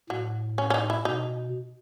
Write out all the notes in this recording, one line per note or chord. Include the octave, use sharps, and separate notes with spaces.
A2 F#3
C#4
C#4
D#4
E4
B2 D#4